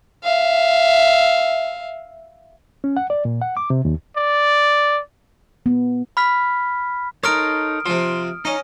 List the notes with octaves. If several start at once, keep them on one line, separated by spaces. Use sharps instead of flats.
E5 F5
C#4
F#5
D5
A#2
F#5
D6
C3
D#2
D5
B3
B5 F6 B6
D#4 A4 A#4 C#5 C6 D#6 F6 D7
C3 F3 C6
C#4 D#4 D#5